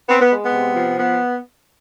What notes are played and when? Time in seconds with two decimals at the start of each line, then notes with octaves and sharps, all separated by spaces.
0.08 B3 C4
0.20 B3
0.31 G#3
0.44 B3
0.54 C3
0.76 F3
0.98 B3